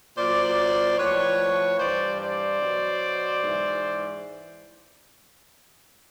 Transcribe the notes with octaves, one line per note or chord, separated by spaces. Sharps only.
A#2 F#3 C5 D5
A2 F3 B4 C#5
G2 E3 C5 D5
C5 D5
B2 F#3
G#2 E3